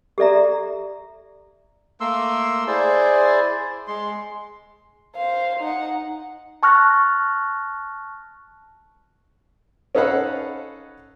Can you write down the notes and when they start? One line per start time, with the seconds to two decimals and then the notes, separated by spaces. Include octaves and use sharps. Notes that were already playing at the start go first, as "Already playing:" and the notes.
0.18 G4 A4 D5 E5 A#5
2.00 A3 A#3 C6 E6
2.68 E4 G#4 C5 D5
3.88 G#3 C6
5.16 C5 F5
5.59 D#4 F#5
6.63 A5 C#6 F6 F#6 A#6
9.95 C#4 D#4 A4 F5 F#5 B5